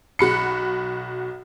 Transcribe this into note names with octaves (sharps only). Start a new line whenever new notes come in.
B1 F#4 B5 C#7